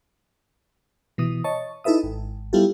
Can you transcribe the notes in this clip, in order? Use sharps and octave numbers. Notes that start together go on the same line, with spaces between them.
B2 E3 D#6
C#5 D#5 A5 C#6
D#4 E4 A4 B4 E5 D#6
G#1
G3 B3 E4 F4 G4 A4